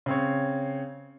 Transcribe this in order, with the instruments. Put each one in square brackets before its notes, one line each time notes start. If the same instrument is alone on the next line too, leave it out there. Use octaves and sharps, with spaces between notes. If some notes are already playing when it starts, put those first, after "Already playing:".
[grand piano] C#3 C4 C#5